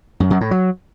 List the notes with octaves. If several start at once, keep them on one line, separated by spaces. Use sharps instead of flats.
F#2
F#2
A2
F#3